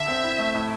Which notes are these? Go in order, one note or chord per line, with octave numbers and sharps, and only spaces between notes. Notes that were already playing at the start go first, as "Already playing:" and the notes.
Already playing: D3 E5
C4
E4
A3
A2